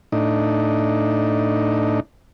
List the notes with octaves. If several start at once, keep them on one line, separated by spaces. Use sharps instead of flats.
A2 D4 D#4